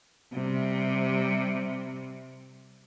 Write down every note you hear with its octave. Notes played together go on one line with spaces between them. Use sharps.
C3 G3